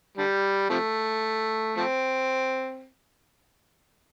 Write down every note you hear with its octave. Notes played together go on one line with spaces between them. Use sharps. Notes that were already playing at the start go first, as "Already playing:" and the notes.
D3 G3
C3 F3 A3
F3 A3 C4